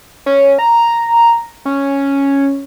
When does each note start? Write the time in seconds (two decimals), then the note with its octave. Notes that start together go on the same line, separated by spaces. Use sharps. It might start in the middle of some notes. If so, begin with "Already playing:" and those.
0.26 C#4
0.59 A#5
1.65 C#4